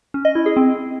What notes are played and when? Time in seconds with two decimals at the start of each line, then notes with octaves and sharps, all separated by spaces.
0.14 C#4
0.25 D#5
0.35 E4
0.46 G#4
0.56 C4